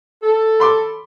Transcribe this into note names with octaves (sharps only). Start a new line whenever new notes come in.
A4
B5 C6 D6